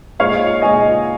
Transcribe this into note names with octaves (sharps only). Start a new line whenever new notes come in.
A#2 G#3 D#4 C#5 F5
A#2 G#3 D#4 D#5 G#5